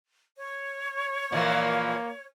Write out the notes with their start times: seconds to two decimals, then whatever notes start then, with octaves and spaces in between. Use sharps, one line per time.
0.38 C#5
1.32 A#2 E3 F3 A#3